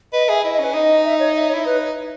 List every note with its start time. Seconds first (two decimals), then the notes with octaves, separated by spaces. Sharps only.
0.13 B4 D#5
0.29 G#4 E5
0.44 E4 D#5
0.54 D#5
0.59 C#4 B4
0.74 D#4 D#5
1.05 E5
1.19 C#5
1.35 E5
1.49 E4 C#5
1.64 D#4 B4